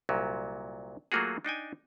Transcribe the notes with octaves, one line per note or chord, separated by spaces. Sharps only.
C2 A#2 F#3
F#3 A3 A#3 F4 F#4 G#4
D4 D#4 G5 G#5